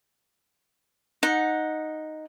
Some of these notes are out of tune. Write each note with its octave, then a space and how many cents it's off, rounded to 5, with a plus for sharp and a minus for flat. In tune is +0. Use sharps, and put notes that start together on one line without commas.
D#4 +0 F#5 -15